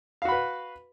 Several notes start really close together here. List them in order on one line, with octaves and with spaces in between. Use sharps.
F5 F#4 B5 B4